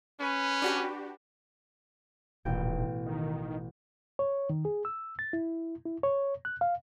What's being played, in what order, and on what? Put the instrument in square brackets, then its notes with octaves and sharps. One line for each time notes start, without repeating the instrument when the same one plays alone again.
[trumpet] C#4 [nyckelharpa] B4
[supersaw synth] D4 F#4 G4
[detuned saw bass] D#1 [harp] A1 B2 G5
[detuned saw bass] D#3
[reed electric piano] C#5
D#3
G#4
E6
A6
E4
E4
C#5
F#6
F5